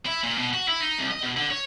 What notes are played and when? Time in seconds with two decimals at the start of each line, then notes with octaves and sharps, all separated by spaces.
0.06 E4
0.23 A#2
0.38 B2
0.53 F#4
0.68 E4
0.81 D#4
0.99 C2
1.11 D#5
1.23 B2
1.37 D3
1.50 C#5